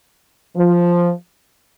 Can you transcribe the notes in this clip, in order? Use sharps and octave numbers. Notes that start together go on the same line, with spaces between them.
F3